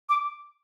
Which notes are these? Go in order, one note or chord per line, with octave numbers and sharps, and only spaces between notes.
D6